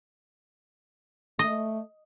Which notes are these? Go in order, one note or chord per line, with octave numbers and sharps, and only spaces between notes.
A3 D#5